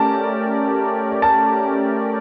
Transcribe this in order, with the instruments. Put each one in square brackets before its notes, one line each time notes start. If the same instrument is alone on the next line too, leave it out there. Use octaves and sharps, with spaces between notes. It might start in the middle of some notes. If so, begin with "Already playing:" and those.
Already playing: [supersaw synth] A3 C#4 G4 A#4 D5 [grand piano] A5
[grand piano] A5